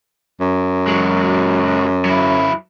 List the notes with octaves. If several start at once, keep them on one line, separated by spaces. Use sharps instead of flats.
F#2
F#3 G#3
F#3 E4